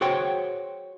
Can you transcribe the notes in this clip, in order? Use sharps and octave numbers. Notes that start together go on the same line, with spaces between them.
F#4 G#4 C5 C#5 G5